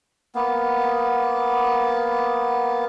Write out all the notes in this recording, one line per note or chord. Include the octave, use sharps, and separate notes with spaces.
A#3 B3